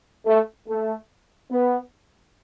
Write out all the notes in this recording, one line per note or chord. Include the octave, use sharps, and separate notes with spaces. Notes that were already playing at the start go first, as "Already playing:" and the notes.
A3
A3
B3